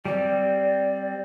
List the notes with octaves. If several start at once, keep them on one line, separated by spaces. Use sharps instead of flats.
G3 C4 D5